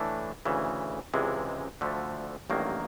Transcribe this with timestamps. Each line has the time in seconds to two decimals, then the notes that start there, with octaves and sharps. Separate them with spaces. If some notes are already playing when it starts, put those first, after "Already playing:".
Already playing: A2 E3 A3 D4
0.45 D2 C#3 E3
1.14 C#2 C3 E3 G#3
1.81 D2 D3 F3 A3
2.50 A1 G2 D#3 F#3 A#3